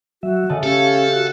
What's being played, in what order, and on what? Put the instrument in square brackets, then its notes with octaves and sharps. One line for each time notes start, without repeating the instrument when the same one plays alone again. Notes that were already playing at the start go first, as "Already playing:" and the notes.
[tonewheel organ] F#3 E5 [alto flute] F#4
[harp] C#3 A3 [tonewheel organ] D#5 F#5 A5
[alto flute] C#4 [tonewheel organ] G4 F5 [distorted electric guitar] A4
[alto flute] F#4 [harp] F#6